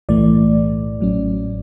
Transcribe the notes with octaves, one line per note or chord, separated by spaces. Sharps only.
B1 A2 E3 A3 D5
A1 A2 F#3 C#4